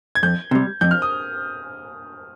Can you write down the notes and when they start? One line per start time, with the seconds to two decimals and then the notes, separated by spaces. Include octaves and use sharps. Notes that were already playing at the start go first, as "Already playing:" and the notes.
0.15 G#6
0.23 F2 G6
0.51 C3 G3
0.81 F2 G6
0.91 F6
1.02 D#6